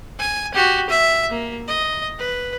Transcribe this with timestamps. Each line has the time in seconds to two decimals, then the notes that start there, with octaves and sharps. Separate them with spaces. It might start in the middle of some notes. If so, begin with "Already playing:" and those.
0.19 G#5
0.54 F#4 G4
0.89 E5
1.30 A#3
1.68 D#5
2.19 B4